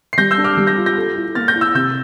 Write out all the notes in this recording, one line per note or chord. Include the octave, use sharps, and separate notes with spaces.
C7
G3 G6 A#6
E6 G6
D4
D6 F6
G3
G6 A#6
F4
G6 A#6
A4
E4
A#3 F6 A6
G6 A#6
E4
E6 G6
C3 E6 G6